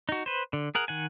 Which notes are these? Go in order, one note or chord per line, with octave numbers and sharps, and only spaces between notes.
D#4 F#4
B4 C5
D3
G#4 A#4 F#5
D#3 F#5 G#5